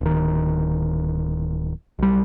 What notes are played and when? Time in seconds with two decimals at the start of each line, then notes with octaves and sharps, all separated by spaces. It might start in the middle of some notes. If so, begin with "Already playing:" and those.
0.01 D1 D#3
1.99 B1 G3